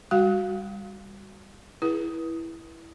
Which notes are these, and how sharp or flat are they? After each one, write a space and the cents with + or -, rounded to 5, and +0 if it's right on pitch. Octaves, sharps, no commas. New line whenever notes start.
G3 +25 F#4 +0 F5 +0
E4 +0 G#4 +0 B4 -35